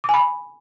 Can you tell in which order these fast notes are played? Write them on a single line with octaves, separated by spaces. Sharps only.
D6 G#5 B5